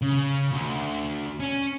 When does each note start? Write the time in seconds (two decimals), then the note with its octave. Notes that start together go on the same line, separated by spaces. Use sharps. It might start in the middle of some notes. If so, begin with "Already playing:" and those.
0.02 C#3
0.52 D2
1.40 C#4